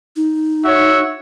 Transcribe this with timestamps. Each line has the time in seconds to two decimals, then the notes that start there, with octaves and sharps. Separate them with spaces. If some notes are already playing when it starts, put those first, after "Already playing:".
0.16 D#4
0.65 F#4 C#5 E5